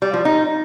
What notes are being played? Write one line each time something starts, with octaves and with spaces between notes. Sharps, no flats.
G3
F3
D#4